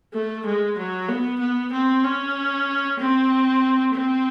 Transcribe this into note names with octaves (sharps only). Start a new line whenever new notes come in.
A3
G#3
F#3
B3
B3
C4
C#4
C4
C4